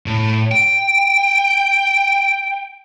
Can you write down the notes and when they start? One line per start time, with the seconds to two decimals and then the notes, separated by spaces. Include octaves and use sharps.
0.06 A2
0.52 G5